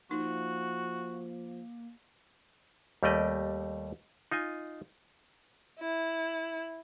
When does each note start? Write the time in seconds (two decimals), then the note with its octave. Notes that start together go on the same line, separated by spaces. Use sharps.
0.11 F3 A#3 D#4 F#4
3.03 D#2 G3 A3 G4 D5 D#5
4.31 D#4 F4 D#5 G#5
5.79 E4